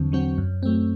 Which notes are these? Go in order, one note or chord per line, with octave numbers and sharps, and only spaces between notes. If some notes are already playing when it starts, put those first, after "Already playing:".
Already playing: E2 D3 F#3 C4
D3 F#3 C4 F#4
F#2
F#3 A3 C4